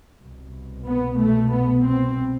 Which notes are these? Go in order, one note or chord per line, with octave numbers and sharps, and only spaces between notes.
C2 B2
B3
A3
B3
C4